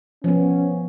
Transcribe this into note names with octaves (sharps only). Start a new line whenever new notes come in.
F3 B3 C#4